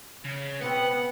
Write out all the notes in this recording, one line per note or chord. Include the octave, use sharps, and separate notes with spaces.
C#3
B2 B3 C4 F#5